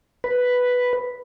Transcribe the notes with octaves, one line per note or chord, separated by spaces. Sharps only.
B4